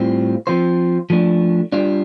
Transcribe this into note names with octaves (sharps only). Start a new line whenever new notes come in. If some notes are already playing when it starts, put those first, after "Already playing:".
Already playing: A2 G3 C4 F4
F3 C4 F4 C5
F3 A3 D4
G3 D4 F4